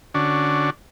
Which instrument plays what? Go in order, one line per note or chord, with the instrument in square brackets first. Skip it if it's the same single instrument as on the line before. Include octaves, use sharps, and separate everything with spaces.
[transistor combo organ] D3 C#4 D4 F#4